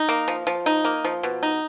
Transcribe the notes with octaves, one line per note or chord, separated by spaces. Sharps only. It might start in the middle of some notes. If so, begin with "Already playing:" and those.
Already playing: D#4
A#3
F3
F3
D#4
A#3
F3
B2
D#4